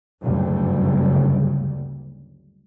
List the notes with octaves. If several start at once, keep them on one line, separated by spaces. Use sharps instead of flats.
F#1 D2 G2 C#3 G3